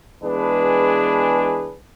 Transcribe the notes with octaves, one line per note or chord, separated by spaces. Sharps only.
E3 G#3 B3 D4 G#4 B4